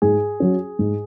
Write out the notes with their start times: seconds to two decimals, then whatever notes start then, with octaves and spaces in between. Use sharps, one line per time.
0.02 G#2 G#4
0.40 F#3 C#4
0.79 G#2